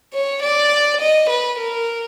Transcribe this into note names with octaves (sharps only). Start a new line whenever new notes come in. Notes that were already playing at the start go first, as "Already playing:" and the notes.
C#5
D5
D#5
B4
A#4